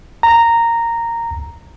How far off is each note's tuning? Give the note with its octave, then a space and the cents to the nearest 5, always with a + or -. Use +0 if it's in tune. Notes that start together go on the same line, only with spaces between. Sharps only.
A#5 -10